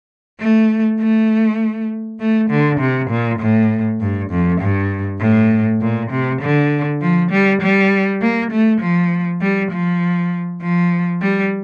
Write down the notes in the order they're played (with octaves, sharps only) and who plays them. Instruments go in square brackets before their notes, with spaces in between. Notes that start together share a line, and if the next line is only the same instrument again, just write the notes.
[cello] A3
A3
A3
D3
C3
A#2
A2
G2
F2
G2
A2
A#2
C3
D3
F3
G3
G3
A#3
A3
F3
G3
F3
F3
G3